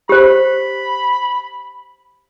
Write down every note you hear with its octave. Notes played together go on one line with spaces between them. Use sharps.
G4 C5 B5